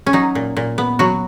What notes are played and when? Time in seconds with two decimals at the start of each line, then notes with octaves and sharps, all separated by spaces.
0.06 C#4
0.13 F#3 D#4
0.35 A#2
0.57 A#2
0.78 B3
0.99 F#3 F#4